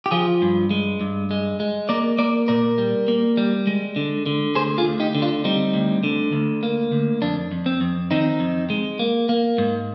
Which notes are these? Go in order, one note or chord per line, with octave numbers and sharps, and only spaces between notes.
G4
F3 F4 G#4
G2
G#3
G2
G#3
G#3
A#3 A#4 D5
A#3 A#4 D5
A#2 A#4 D5
G3
A#3
G3
G#3
D3
D3
D2 G#4 C5
F4 G#4
D2
D#4 G4
D3
D4 F4
G3 C4 D#4
D2
D3
D2
A#3
D2
F2 D4
F2
C4
F2
D#3 C4 D#4
F2
G#3
A#3
A#3
G#2